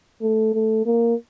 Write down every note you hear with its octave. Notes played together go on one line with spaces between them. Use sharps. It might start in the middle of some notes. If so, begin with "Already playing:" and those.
A3
A3
A#3